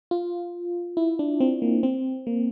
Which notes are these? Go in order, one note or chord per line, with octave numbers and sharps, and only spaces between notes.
F4
E4
D4
C4
A#3
C4
A#3